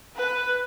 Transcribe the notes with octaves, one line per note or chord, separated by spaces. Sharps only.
B4